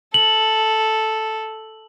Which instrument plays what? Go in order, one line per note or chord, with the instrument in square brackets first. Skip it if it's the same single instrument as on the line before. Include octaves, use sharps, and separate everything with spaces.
[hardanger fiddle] A4 [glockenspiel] F#7